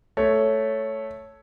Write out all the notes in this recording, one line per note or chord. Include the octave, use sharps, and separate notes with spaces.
A3 C#5